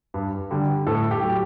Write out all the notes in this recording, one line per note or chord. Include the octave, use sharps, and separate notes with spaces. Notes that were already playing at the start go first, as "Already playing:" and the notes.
G2
D3 G3
A2 A4
G4
F#3